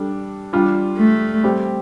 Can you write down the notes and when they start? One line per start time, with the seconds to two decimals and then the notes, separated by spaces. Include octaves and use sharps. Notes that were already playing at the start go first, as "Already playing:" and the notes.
Already playing: G3 D4 A4
0.53 G3 D4 F4
0.98 A3
1.43 G3 C4 G4